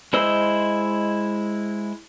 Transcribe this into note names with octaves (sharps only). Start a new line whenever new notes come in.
G#3 E4 C5 D#5 E6